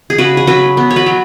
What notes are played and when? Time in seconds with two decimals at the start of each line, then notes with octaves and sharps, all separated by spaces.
0.10 G#4
0.18 C#3 F#4 B4
0.37 G#4
0.47 F#3 F#4 B4
0.77 B3
0.91 C#5
0.96 F#4 B4
1.06 F#3